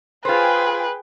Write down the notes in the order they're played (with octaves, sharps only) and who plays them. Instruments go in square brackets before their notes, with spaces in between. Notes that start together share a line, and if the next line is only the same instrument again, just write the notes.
[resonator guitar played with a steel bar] F4 C5 [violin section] G#4 G5 [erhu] B4